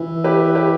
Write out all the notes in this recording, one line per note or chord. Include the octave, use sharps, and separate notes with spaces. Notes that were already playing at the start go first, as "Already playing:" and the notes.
Already playing: E3
G4 B4
G4 B4